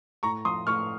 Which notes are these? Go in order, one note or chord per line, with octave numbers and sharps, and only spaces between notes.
A2 A#5 C#6
F3 C6 D#6
A2 C#6 F6